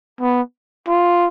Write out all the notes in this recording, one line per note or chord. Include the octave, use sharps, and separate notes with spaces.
B3
F4